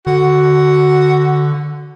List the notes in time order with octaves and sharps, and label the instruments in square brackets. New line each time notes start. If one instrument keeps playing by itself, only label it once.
[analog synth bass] D3 [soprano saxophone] F#4